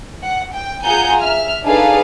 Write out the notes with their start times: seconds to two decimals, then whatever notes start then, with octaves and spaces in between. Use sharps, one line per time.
0.23 F#5
0.54 G5
0.84 F4 G#4 F#5 G#5 A#5 G6
1.22 E5 F6
1.63 D4 D#4 G#4 A4 B4 F5